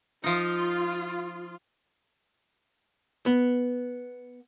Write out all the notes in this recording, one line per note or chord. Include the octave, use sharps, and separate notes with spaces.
F3 D#4 F4
B3